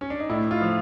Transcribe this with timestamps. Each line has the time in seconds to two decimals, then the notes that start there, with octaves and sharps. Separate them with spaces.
0.01 C#4
0.10 D4
0.20 D#4
0.29 A2 E4
0.51 F4
0.62 F3